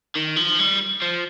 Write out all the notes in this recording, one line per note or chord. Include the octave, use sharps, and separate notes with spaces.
D#3
F3
G3
F3